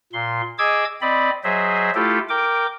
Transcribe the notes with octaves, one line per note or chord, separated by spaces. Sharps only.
A#2 C6
G#4 D#5 D6 E6 G#6
C4 D5 D#5 B5
F#3 G#4 C5 D#5 E5
A3 E4 F4 G4 A4
A#4 G5 D6